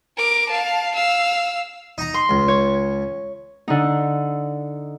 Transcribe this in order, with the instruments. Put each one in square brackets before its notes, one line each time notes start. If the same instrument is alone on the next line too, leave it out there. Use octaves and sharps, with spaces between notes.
[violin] A#4 D6
F5 A5
F5 E6
[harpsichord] D#4 A#5
[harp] C6
[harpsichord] C#2
[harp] C#5
D3 D#4